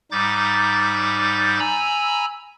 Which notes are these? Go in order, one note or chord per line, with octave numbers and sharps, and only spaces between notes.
G#2 G3 D#4 D6 G6 A6
G#5 A#5 B5 E6